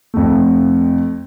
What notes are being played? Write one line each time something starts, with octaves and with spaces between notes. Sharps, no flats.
F2 A3